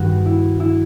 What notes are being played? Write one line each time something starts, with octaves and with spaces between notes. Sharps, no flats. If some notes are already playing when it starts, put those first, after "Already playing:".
Already playing: G2 D#3 G3 F#4
E4
E4